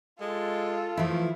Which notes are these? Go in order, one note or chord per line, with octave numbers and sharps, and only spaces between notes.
G#3 F4 A4
E3 F3 A3 E4